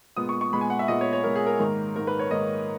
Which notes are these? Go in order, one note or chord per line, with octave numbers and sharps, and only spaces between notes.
A#2 G#3 B3 D#6
C#6
C#6
A#2 G#3 B3 B5
G#5
F#5
E5
A#2 G#3 B3 D#5
C#5
C#5
A#2 G#3 B3 A#4
G#4
A#4
G#2 D#3 A#3
G#2 D#3 A#3 A#4
B4
C#5
G#2 D#3 A#3 D#5